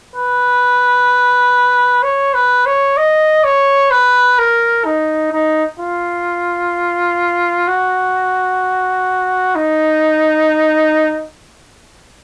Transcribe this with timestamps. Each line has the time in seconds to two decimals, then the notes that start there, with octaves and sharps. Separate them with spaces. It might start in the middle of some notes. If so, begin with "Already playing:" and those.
0.15 B4
2.03 C#5
2.34 B4
2.66 C#5
2.97 D#5
3.44 C#5
3.91 B4
4.38 A#4
4.85 D#4
5.33 D#4
5.79 F4
7.68 F#4
9.55 D#4